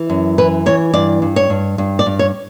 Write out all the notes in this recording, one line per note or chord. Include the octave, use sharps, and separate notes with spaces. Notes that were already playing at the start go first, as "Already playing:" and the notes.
Already playing: E3
F#2
E3 B4
E3 C#5
G2 D5
G2
C#5
G2
G2
D5
G2
C#5